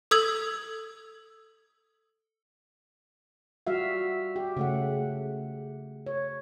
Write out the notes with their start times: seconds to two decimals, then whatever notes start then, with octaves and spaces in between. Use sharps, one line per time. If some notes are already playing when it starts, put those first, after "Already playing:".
0.11 A4 D#6 E6 G#6 F#7
3.67 G3 F4 F#4 E5 F5
4.36 G4
4.57 C#3 A3 F#5
6.07 C#5